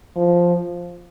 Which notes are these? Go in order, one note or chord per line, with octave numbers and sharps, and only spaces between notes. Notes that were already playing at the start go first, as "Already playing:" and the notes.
F3